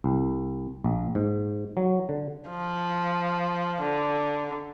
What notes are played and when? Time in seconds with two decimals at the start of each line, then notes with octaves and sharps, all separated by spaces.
0.04 C2
0.84 A#1
1.15 G#2
1.77 F#3
2.09 D3
2.49 F3
3.82 D3